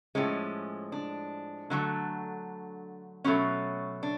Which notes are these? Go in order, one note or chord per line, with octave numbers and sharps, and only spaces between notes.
A2 F3 G#3 C#4
D4
D3 F#3 A3
B2 F#3 A3 C#4
D4